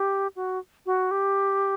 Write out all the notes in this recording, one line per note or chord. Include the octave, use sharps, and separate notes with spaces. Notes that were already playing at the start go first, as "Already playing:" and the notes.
Already playing: G4
F#4
F#4
G4